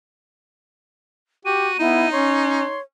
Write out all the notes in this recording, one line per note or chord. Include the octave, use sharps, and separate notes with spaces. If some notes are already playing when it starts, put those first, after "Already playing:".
F#4 G4 D#7
B3 D#4 E4
C#4 C#5 C6